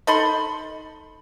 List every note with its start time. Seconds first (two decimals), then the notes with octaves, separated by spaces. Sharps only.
0.07 D#4 A4 B5 C6